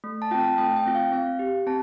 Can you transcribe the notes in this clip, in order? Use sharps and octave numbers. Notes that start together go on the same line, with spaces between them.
A3
A5
C4 F4 G5
A5
A3 G5
G5
C4 F4
F5
C4 F5
G4
C4 A5